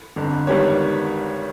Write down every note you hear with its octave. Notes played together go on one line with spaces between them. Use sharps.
G1 F2 D3
G#1 G#2 D#3 G3 B3 C#5